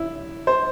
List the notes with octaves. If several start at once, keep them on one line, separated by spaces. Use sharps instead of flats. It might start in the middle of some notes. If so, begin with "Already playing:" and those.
Already playing: E4
C5